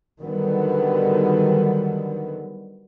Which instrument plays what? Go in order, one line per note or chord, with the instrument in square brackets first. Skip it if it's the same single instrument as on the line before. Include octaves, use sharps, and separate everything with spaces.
[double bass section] D3 D#3 F#3 G3 B3